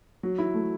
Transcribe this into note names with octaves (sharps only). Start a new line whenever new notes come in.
F#3
E4
A3